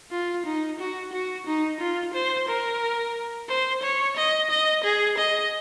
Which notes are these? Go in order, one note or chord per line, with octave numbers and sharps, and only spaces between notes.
F4
D#4
F#4
F#4
D#4
F4
C5
A#4
C5
C#5
D#5
D#5
G#4
D#5